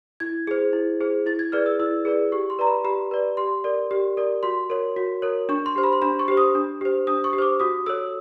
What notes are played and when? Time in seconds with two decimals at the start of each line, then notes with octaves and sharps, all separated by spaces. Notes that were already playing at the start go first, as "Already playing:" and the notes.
0.20 E4 G#6
0.47 G#4 C5
0.73 E4
1.01 G#4 C5
1.26 E4 A6
1.39 G#6
1.52 G#4 B4 D5 F6
1.66 E6
1.80 E4 E6
2.05 G#4 B4 D5
2.32 G4 C#6
2.50 C6
2.59 B4 D5 A#5
2.67 B5
2.84 G4 B5
3.11 B4 D5
3.37 G4 C6
3.64 A#4 D5
3.91 G4
4.17 A#4 D5
4.43 F#4 C6
4.70 A#4 C#5
4.96 F#4
5.22 A#4 C#5
5.49 D4 C#6
5.66 C6
5.76 G4 C5
5.83 B5
5.93 C6
6.02 D4 B5
6.19 C#6
6.28 G4 C5
6.37 D#6
6.55 D4
6.81 G4 C5
7.07 D4 D#6
7.24 C#6
7.33 G4
7.38 C5 D6
7.60 F#4 D#6
7.86 A4 C#5 E6